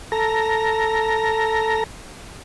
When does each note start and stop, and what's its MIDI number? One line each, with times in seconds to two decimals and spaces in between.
0.12 1.84 69
0.12 1.84 82